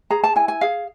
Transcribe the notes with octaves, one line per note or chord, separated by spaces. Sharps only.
G#4 A#5
A5
E4 G#5
G#5
G#4 F5